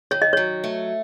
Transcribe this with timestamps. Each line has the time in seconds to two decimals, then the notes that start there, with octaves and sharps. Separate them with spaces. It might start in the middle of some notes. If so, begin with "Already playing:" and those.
0.11 D#3 C#5
0.22 D#5
0.33 F#3 C#5
0.64 A3